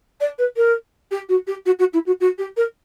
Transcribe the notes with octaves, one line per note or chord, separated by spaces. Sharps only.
D5
B4
A#4
G4
F#4
G4
F#4
F#4
E4
F#4
F#4
G4
A#4